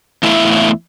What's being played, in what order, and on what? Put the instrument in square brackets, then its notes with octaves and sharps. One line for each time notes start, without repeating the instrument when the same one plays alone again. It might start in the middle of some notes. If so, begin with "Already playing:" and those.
[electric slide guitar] E2 A3 E4 E5 F5